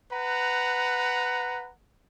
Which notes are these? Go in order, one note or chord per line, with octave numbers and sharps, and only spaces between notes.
B4 F#5 A#5